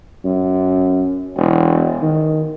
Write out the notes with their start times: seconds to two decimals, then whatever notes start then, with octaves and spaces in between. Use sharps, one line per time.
0.25 F#2
1.37 E1
2.02 D#3